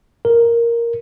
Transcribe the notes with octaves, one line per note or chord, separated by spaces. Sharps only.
A#4